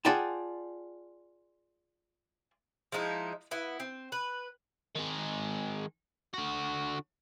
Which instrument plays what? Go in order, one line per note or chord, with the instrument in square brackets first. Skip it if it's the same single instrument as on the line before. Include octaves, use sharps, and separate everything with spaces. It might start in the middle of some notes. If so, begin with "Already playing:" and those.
[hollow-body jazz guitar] F4 G#4 D5 F#5 G5 A5
[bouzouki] F3 G#3 D#4 E4
B3 E4
C4
B4
[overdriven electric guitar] D#3 G#3
D3 F#4